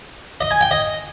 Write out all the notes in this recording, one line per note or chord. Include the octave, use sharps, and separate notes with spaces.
D#5
G#5
G5
D#5